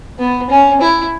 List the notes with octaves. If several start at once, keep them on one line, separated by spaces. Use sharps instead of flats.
B3
C#4
E4